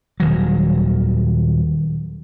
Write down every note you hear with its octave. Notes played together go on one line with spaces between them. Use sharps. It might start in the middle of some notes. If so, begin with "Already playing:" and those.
D#1 D#3 F#3